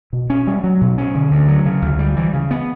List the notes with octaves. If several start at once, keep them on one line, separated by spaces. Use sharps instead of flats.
B2
C#4
G3
F#3
B2
C#4
D3
D2
F#3
C#3
D2
G3
E3
C#3
B3